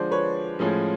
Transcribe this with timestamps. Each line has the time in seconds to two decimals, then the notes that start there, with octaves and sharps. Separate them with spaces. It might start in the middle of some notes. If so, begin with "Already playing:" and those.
Already playing: D3 F3 G#3 C5 D5
0.11 B4 C#5
0.59 A2 F3 G#3 C#4